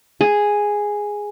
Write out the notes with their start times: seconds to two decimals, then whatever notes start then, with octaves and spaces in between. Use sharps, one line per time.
0.21 G#4